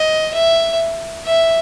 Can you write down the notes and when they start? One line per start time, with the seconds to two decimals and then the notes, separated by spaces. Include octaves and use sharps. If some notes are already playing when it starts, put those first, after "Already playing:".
Already playing: D#5
0.34 E5
1.25 E5